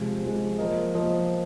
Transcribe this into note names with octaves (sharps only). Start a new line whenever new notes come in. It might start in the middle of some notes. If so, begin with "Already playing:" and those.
Already playing: C3 F3 G#3
C3 F3 G#3
F3 A#3 F4 A#4 D#5
F3 A#3 F4 A#4 D#5